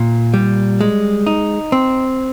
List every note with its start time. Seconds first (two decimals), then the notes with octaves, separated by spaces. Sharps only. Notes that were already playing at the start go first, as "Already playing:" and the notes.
Already playing: A#2
0.34 G3
0.81 G#3
1.27 D#4
1.72 C4